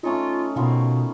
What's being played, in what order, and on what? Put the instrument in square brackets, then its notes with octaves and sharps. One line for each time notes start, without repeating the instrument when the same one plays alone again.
[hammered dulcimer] A3 C#4 D#4 [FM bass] F4
[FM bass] B2 [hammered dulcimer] D#3 F3 B3